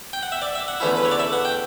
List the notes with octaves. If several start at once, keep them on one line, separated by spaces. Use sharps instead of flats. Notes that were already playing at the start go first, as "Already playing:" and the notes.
G5
F#5
E5
D5
E5
F#5
E2 D3 A3 C#4 E4
B4
C#5
D5
E5
F#5
G5